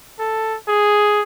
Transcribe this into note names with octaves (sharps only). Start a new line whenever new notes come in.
A4
G#4